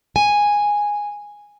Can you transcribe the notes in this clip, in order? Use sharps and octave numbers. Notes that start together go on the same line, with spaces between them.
G#5